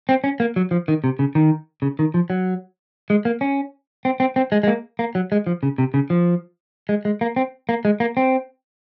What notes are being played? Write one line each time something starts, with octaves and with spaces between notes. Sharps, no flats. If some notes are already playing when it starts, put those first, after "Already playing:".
C4
C#4
A#3
F#3
F3
D#3
C3
C#3
D#3
C#3
D#3
F3
F#3
G#3
A#3
C#4
C4
C4
C4
G#3
G#3
A#3
A#3
F#3
G#3
F3
C#3
C3
C#3
F3
G#3
G#3
A#3
C4
A#3
G#3
A#3
C4